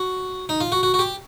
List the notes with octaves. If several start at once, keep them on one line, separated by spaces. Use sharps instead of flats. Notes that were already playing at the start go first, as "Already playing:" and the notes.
Already playing: F#4
D#4
F4
F#4
F#4
F#4
G4